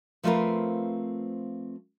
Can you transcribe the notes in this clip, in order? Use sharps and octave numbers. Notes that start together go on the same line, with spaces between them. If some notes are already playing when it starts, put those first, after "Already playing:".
F3 A3 C4 F4 A#4 B4